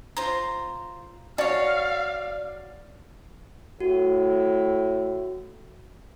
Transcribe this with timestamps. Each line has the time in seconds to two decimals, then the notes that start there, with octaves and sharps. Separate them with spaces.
0.17 F4 C5 A#5
1.38 F#4 C#5 D5 F5 A6
3.80 A2 F#4